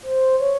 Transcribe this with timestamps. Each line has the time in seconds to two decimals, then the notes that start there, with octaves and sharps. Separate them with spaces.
0.03 C5
0.40 C#5